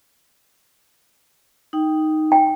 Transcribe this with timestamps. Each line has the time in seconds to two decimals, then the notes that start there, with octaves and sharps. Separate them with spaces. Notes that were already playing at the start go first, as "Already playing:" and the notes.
1.73 D#4 G5
2.32 G5